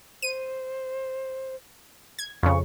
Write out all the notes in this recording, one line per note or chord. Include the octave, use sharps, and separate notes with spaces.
C5 D#7
G#6
F2 C#3 C#6